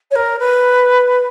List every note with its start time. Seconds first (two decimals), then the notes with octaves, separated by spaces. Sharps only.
0.11 C#5
0.15 A#4
0.39 B4